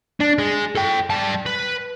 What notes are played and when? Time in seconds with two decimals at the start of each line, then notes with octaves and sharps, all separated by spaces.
0.21 D4
0.39 G#3
0.75 A4 G5
1.10 G3 A5
1.46 B4